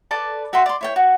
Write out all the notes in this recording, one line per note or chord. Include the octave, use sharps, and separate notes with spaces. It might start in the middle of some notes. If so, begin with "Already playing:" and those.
A4 B4 D5 A5
F#4 E5 G5 C6
D5 C6
E4 C#5 G5
F#4